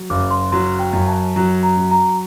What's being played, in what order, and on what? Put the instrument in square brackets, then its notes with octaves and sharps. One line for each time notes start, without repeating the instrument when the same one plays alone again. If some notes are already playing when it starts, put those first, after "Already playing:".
Already playing: [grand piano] F#3
[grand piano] F#1 [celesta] D6
[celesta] C6
[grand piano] F#3 [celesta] C6
[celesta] G5
[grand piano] F#2
[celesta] A5
[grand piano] F#3 [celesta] A#5
[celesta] A#5
[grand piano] F#3
[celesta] A#5